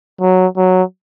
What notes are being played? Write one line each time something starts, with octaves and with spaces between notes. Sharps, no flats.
F#3
F#3